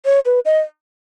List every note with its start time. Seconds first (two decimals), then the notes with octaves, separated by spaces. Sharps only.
0.05 C#5
0.25 B4
0.45 D#5